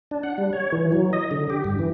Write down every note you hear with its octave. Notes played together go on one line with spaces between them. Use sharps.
D4
F#5
G3
C#5
E3
F#3
D#5
D3
G4
G2
E3